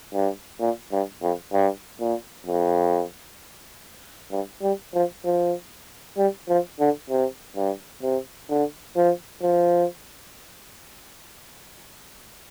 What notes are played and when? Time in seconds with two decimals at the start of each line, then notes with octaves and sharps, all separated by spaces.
0.14 G2
0.60 A#2
0.92 G2
1.22 F2
1.53 G2
2.00 A#2
2.46 F2
4.31 G2
4.62 G3
4.94 F3
5.24 F3
6.17 G3
6.48 F3
6.79 D3
7.10 C3
7.56 G2
8.02 C3
8.49 D3
8.96 F3
9.42 F3